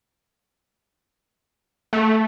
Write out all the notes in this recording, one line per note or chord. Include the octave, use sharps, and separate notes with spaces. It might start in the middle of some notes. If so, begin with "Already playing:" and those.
A3